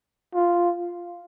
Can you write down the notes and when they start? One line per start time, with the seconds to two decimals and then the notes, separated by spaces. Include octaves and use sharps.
0.34 F4